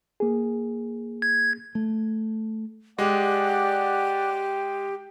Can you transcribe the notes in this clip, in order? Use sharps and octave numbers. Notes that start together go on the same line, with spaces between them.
A#3 G#4
G#6
A3
G#3 G4 D5 F#5